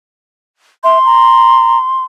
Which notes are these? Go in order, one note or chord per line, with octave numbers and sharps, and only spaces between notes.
E5 C6
A#5